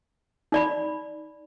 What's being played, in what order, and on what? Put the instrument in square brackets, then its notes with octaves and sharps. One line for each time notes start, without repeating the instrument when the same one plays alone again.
[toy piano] D#4 D5 B5